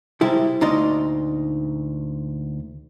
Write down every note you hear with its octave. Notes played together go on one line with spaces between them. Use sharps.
C3 G3 G#3 E4 G4
D2 A#2 D#4 D5 D#5 C6